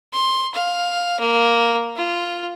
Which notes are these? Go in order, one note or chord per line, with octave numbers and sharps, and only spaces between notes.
C6
F5
A#3
F4